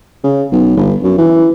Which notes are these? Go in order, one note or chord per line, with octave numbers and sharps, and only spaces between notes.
C#3
B1
G1
F#2
E3